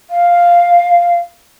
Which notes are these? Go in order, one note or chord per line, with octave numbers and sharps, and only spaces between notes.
F5